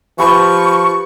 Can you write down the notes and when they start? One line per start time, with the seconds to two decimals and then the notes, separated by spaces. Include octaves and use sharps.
0.19 F3 G4 B4 C#6